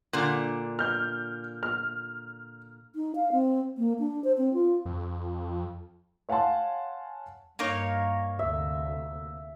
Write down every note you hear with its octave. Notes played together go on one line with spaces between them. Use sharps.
A#2 D3
F6 G6
F6
D#4
F5
C4
A#3
D4
C5
C4
F4
F2
C#5 F5 F#5 G#5 A5 C6
G2 A#3 D#4 C#5
D2 C3 E5